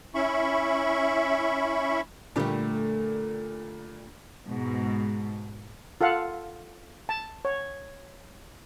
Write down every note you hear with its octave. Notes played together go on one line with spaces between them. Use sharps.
C#4 E4 E5 B5 C#6
A#2 D3 G3 A3 G4
G#2 B2
F4 A4 F5 F#5
A5
C#5